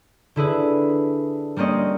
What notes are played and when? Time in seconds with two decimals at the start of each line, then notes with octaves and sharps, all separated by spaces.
0.36 D3 E4 G#4 B4
1.56 G3 A#3 C4 C#4 D#5